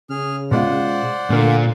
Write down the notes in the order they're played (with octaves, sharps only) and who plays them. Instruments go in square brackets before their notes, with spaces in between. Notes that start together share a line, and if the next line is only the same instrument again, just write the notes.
[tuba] C#3 [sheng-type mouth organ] G#4 F6
[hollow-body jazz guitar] B2 G#3 F4 [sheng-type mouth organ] C5 D5 F#5
[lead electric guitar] A#2 [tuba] D3 [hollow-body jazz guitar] A3 A#3